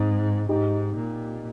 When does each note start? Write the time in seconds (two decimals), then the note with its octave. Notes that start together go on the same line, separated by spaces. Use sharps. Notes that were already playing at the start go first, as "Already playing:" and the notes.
Already playing: G#2 C4 D#4
0.49 G#2 D#4 G4
0.96 A#2